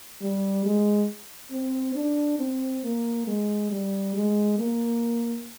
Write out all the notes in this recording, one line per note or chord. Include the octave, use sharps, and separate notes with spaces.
G3
G#3
C4
D4
C4
A#3
G#3
G3
G#3
A#3